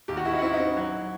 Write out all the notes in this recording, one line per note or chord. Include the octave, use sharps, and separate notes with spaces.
D#2 G4
F#4
D#3 E4
D#4
F#4
C4 E4
D#4
C4
F#3